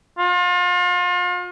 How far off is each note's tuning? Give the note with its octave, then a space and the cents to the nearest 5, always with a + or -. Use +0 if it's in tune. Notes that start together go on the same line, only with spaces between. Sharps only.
F4 +35